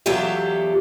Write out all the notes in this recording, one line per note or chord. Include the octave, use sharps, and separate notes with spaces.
E2 F#3 A3 F4 G4 E5